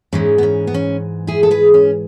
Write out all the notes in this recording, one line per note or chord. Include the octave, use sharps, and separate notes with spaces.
G#2 E3 G#3 C#4
B3
C#4
B3
C#4
E4 G#4
A4
G#4 B4
C#4